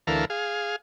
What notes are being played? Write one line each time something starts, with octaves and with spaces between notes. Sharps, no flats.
D2 E3 A4 A#4 F5
G#4 F5